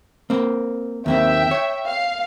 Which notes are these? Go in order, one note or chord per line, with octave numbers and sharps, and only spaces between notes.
A#3 C4
D#2 A#3 C4 E5 G5
C#5
F5